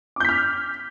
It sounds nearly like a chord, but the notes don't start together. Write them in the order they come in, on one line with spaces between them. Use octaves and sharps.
D6 G6 B6 F6